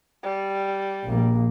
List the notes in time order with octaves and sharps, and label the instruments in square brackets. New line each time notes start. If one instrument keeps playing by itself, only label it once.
[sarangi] G3
[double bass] A#1 A#3